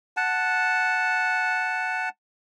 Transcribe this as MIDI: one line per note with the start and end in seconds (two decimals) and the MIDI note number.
0.17 2.09 78
0.17 2.09 81